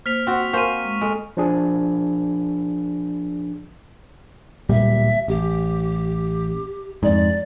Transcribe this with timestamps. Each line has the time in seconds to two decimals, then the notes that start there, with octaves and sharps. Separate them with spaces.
0.06 A#3 C5 F6 B6 F7
0.27 C4 F#4
0.53 A#3 C5 G#5 C#6 F6 D#7
0.85 G#3
1.01 G#3 A4
1.37 F3 D4 G#4
4.69 D1 A#2 G3 E5
5.28 A1 G4
7.03 F2 G#2 D5